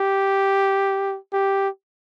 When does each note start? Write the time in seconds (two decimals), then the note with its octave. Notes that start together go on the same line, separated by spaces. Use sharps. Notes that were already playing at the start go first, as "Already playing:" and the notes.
Already playing: G4
1.33 G4